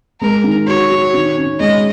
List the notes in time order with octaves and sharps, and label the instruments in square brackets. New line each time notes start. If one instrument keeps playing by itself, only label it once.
[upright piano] G#3 [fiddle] A#4
[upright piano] D#3
[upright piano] F#4 [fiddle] C#5
[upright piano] F#4
D#3
C#4
[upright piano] G#3 [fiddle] D#5